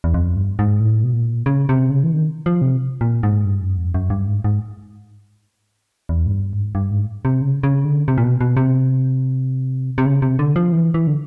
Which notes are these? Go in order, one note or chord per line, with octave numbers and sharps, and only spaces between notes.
E2
F2
G2
G#2
A2
B2
A#2
C#3
C3
C#3
E3
D#3
F3
C3
A#2
G#2
G2
F#2
F2
F#2
G2
G#2
G#2
E2
G#2
G2
G#2
G2
G#2
C3
C#3
C#3
D3
C3
A#2
B2
B2
C3
C3
C#3
C3
D3
F3
E3
E3
D3